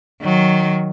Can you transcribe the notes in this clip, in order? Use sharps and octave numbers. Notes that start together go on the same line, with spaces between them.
D#3 F#3